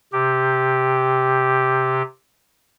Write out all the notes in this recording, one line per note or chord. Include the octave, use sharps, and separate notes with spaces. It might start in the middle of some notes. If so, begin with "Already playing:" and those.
C3 G4